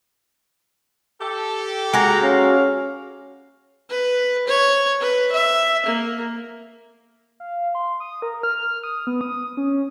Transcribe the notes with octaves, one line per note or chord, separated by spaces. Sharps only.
G4 A4
G#3 A#3 F#4 A#5
C#4 F5
B4
C#5
B4
E5
A#3
F5
C6
D#6
A#4
F6
D#6
B3
D#6
C#4